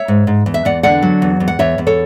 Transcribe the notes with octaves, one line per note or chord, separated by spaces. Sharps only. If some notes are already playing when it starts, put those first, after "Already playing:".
Already playing: C#5 E5
G#2
G#2
E2
E5
E2 D5 F#5
D3 D5 F#5
F#3
E2
E2
F#5
E2 C#5 E5
E2
A4 C#5